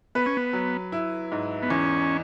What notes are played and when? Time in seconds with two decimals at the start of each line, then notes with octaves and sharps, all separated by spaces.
0.15 B3 B4
0.26 C#4
0.37 B3
0.53 F#3
0.92 E4
1.32 G#2
1.63 B3
1.70 E2 C#4